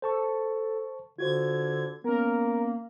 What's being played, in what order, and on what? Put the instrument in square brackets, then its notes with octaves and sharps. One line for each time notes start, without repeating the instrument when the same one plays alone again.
[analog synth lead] A4 [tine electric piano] C5 A5 C#6
[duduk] D3 [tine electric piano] F4 F#4 C5 [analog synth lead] G#6
[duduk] A#3 [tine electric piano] B3 C#4 [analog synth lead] A#4